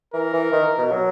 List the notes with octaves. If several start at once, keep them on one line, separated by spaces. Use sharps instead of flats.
E3 A#4
E3
D#3
B2
F#3